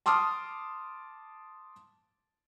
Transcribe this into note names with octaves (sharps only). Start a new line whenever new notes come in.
A5 C6 D6 D#6 F6